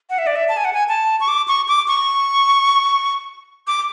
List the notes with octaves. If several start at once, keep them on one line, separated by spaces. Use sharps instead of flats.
F#5
E5
D5
E5
A5
G#5
F#5
G#5
A5
C#6
D6
C#6
D6
C#6
D6